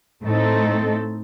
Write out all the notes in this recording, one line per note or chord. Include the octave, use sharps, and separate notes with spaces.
A2 A3 C4 D#4 A4